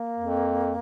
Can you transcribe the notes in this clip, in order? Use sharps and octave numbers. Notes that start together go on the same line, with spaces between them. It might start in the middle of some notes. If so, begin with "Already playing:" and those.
Already playing: A#3
F2